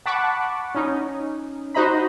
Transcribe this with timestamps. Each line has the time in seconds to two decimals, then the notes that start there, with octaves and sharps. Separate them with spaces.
0.06 F#5 A5 B5 C#6 D6 F#6
0.75 C#4 D#4
1.74 D#4 F#4 C5 D#5 A#5 B5